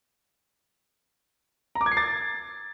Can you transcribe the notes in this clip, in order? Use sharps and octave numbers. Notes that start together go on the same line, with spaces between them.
A#5
D6
G#6
C7
A6